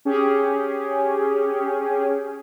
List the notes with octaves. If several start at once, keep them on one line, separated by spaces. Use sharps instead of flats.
C#4 G4 G#4